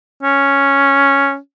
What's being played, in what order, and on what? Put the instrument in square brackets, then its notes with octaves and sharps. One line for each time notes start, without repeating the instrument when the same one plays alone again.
[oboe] C#4